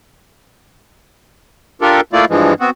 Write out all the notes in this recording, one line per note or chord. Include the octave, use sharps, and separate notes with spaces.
D4 F4 G4 A4 A#4
A3 A#3 E4 F4 D5
G2 E3 F3 G#3
B3 C4 F#4